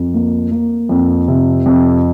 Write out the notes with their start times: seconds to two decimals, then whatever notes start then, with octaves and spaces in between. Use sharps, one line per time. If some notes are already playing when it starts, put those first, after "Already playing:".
Already playing: F2
0.14 A#3
0.51 A#3
0.89 F2
1.28 C3
1.66 F2